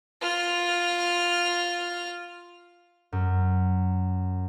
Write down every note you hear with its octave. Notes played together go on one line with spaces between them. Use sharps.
F4 F6
F#2